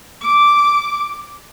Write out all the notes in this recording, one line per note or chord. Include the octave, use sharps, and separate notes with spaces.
D6